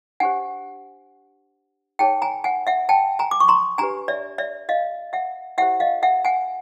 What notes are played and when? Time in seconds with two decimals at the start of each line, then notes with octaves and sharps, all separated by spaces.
0.20 D4 G4 C5 F#5 G#5
1.99 D#4 G#4 C#5 G5 A5
2.22 G#5 A#5
2.44 F#5 G#5
2.67 E5 F#5
2.89 G5 A5
3.19 G#5 A#5
3.31 D6
3.40 C#6
3.48 A#5 C6
3.78 D4 G4 B4 G#5 A#5
4.08 D5 E5
4.38 D5 E5
4.69 D#5 F5
5.13 E5 F#5
5.58 E4 G4 C5 E5 F#5
5.80 D#5 F5
6.03 E5 F#5
6.25 F#5 G#5